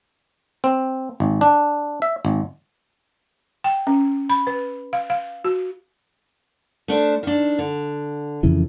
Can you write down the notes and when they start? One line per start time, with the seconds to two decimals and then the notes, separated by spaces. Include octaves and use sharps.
0.64 C4
1.20 G#1
1.41 D4
2.02 E5
2.25 G#1
3.64 G5
3.87 C#4
4.29 B5
4.47 B4
4.93 F5
5.10 F5
5.45 F#4
6.88 A3 D4 C5
7.23 D#3 D4
7.59 D3
8.43 F2 C#3 E3